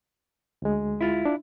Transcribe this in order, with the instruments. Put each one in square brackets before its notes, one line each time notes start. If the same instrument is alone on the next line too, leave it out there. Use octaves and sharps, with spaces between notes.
[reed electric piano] D2 G#3
[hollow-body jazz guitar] E4 F4
[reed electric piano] D4